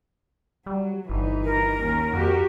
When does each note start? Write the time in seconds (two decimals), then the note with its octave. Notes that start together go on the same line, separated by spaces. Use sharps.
0.66 F#3 G3
1.10 G1 E3 D#4
1.44 A#4
1.80 D#2 C#4
2.13 F2 F#4 G4